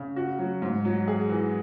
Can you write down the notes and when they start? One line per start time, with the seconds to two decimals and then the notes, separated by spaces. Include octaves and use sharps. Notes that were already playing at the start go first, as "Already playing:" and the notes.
Already playing: C#3
0.16 F#4
0.39 F#3
0.62 G#2
0.85 F#3
1.08 G#4
1.29 E3